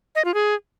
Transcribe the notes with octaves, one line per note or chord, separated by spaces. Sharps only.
D#5
F4
G#4